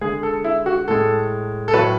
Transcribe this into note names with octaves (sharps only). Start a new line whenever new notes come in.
D3 G#3 G#4
A4
E4
F#4
A2 G#3 A4
A4
A2 F#3 A3 B4